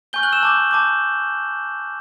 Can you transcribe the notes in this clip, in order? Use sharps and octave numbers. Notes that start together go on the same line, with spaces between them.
G#5 C#6 F6 G6 G7
F#6 F#7
E6 E7
A5 D6 G6
A5 D6 G6